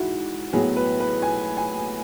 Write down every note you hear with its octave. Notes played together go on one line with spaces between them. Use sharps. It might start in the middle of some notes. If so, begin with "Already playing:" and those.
Already playing: G#2 E3 E4 F#4
A2 F#3 B3 G#4
B4
B4
G#5
G#5